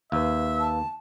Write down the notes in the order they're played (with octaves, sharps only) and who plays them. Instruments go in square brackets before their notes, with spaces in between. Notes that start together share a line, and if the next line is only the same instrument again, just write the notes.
[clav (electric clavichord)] D#2 [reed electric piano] B4 F5 [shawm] E5
[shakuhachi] A5